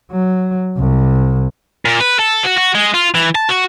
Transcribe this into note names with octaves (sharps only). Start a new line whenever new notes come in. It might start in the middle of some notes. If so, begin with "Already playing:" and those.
F#3
C2
A#2
B4
A4
F#4
F#4
G#3
F4
E3
A5
F#4